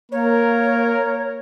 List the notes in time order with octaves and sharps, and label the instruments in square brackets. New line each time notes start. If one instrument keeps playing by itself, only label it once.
[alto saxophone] A#3 [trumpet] A#4 [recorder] C#5